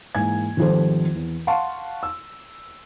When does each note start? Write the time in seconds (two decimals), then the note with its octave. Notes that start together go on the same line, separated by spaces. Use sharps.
0.15 G#2 E3 A#3 E4 G#5 G#6
0.57 G#1 D#3 F3 G3 A4 C5
1.16 E2
1.47 F5 F#5 A5 C6 C#6
2.03 E6